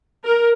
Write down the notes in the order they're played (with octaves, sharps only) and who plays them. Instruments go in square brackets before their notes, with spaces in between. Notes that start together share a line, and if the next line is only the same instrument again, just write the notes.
[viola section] A#4